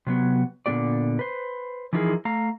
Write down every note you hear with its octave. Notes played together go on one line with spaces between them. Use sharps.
C3 F#3 B3
A#2 D3 G3 B3 G4 D5
B4 C5
E3 F3 D#4 E4 G#4 A#4
A3 F5 A#5